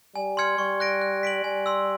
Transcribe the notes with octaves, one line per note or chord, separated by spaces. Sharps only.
G3 G#5
C6 F6 G#6 C#7
G3 C#6
F#6 A#6 D7
F#6
B6 D7 F#7
G3 G#5
C6 E6